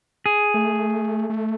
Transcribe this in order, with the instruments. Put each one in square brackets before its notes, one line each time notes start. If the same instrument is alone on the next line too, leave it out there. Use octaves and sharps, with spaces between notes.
[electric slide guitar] G#4
[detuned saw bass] A3
A3